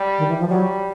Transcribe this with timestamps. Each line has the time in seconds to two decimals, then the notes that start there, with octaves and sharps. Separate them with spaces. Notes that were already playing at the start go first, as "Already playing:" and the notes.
Already playing: G3
0.18 D#3
0.29 E3
0.40 F3
0.49 F#3 G3